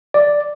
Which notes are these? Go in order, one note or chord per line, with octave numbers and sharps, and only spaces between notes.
D5